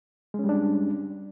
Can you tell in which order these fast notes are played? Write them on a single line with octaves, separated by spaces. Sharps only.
G#3 C#4 G3 D4